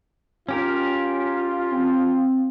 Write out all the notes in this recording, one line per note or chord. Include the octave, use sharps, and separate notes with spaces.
C#4 F4 G4 A#4
C4